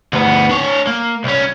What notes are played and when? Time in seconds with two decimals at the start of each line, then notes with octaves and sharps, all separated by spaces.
0.13 D2 B3
0.49 D4 C#5
0.87 A#3
1.24 C2 C#4